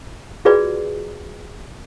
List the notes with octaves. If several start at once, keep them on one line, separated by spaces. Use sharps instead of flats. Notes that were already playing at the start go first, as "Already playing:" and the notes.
F4 F#4 G#4 B4 D5